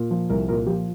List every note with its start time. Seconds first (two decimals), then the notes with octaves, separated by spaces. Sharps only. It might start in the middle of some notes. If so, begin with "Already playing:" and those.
Already playing: A#2
0.11 F3
0.30 C2 A#4
0.48 A#2 A#4
0.67 F3 G4